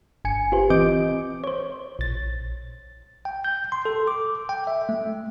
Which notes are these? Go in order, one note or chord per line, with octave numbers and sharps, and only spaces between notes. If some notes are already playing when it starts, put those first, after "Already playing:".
G1 G#5 C#7
F4 G4 B4 C5
E3 C4 D#5 D6 G6 D7
C5 C#5
A#1 A6
G5
G6
C6
A4
D6
G5
E5
A3